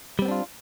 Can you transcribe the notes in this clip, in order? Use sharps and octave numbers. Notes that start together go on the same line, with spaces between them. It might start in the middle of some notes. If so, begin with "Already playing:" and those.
G3 B3 C4 D4 F4